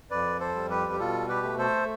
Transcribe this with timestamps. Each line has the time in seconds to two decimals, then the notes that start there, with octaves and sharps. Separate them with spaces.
0.11 F2 B4 D5
0.40 A4 C5
0.55 G3
0.70 G4 B4
0.92 G4
0.99 B2 F4 A4
1.29 G4 B4
1.43 A3
1.58 A4 C5